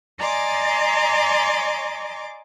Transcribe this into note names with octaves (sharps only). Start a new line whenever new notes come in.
D5 D#5 G#5 A#5 C6 D6